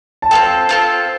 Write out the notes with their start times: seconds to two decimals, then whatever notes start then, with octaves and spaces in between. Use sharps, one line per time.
0.22 A5
0.31 C4 F4 A4 G5
0.69 C4 F4 A4